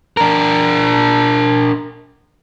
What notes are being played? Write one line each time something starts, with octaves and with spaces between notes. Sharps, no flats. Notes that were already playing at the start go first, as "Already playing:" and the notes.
D4 A#4